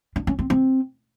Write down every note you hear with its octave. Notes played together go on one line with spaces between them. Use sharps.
D4
C#4
C4
C4